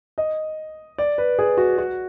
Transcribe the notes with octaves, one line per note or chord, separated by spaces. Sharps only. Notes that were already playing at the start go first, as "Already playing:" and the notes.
D#5
D5
B4
G#4
F#4
F#4